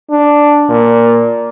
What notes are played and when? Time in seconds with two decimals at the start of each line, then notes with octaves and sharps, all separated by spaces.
0.10 D4
0.69 A#2